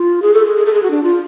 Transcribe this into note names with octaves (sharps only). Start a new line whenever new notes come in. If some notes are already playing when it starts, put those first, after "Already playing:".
Already playing: F4
G#4
A4
G#4
G#4
A4
G#4
F#4
D4
F4